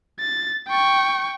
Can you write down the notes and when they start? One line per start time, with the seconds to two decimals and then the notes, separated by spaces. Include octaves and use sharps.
0.20 A6
0.68 G5 C#6